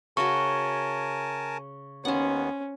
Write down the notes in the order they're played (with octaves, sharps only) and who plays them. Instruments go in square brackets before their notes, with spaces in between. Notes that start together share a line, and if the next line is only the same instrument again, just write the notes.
[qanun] C#3 F#4 [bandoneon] A#4 G#5 A5 [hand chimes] C#6
[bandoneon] D#2 D#3 B3 [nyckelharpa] C#4 [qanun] C5 F#5